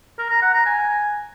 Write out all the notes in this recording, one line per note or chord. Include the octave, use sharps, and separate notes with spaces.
A#4
A#5
F#5
A#5
G#5